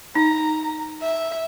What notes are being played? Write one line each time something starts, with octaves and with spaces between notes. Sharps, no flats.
D#4 A#5
E5